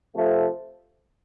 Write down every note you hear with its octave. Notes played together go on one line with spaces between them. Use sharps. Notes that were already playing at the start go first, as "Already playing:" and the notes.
C3 F3 A3